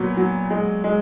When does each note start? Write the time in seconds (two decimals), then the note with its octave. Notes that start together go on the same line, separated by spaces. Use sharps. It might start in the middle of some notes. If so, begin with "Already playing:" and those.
Already playing: A#2 F#3 B3
0.17 F#3
0.50 G#3
0.84 G#3